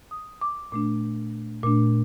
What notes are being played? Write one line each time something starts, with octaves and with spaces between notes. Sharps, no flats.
D#6
D6
A#2 A3 D4 D6
A#2 A3 D4 D6